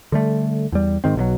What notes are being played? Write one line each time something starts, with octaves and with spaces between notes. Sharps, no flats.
D3 G3 A3
E2 G3
G#2 D#3 C4
B1 B2 D3 F#3